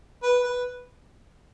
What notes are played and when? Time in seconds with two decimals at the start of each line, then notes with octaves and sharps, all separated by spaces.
0.23 B4
0.44 B4